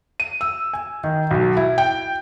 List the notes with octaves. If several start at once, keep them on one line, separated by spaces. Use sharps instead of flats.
D#7
E6
G#5
D#3
B1
E4
G5